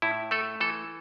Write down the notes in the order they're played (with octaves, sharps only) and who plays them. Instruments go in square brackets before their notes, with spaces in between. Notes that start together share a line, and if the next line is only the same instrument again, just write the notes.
[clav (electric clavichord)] A2 E4
A3 A4
E3 A4